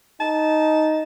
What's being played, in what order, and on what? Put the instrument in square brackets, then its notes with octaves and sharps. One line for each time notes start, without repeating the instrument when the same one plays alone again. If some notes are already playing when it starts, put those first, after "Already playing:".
[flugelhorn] D#4 [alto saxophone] A5